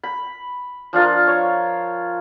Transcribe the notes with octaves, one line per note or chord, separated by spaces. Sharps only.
B5
F3 D4 F4 A#4
C#5